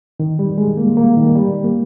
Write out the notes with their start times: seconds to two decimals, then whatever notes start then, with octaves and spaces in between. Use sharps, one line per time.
0.20 D#3
0.39 G3
0.58 G#3
0.77 A#3
0.97 A#3
1.17 D#3
1.35 G3
1.64 A#3